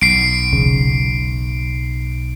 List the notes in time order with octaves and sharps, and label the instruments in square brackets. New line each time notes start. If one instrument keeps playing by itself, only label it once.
[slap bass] B1 [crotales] C7 D7
[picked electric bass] E1 C#3